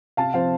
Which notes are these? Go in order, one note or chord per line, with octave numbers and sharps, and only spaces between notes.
C3 F5 A5
F3 C4 C5 F5